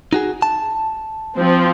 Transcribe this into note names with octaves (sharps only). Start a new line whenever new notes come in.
D#4 F#4 G#4
A5
F3 C4